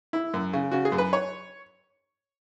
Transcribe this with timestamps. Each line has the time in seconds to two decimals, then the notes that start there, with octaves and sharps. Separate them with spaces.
0.13 E4
0.34 F#2
0.53 C#3
0.71 C#3 F#4
0.85 G#4
0.92 F#2
0.98 B4
1.13 C#5